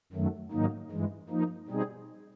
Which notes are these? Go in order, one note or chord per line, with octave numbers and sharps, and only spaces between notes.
F#2 D#3 F#3 A3
G#2 D#3 F#3 A#3 D#4
G2 E3 G#3
F3 A#3 D#4
B2 G3 C4 D#4 G#4